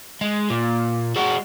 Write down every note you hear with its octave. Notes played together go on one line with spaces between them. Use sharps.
G#3
A#2
G#3 F#4